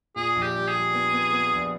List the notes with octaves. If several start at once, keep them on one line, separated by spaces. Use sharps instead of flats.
A#2 G#4
A#1
G4
G3
G#4
G3
B3
B3
B3
A#1